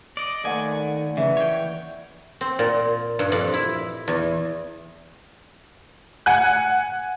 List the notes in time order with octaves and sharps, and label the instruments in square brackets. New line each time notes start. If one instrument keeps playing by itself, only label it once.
[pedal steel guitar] D5 D#5
[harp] D#2 D5 F#5 [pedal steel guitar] D#3 A3 G#5
[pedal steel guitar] C#3 [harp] E3
[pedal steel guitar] C#5 G5
[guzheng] C4
A#2
G2
F2
E4
E2
[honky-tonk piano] F#5 G#5 F#6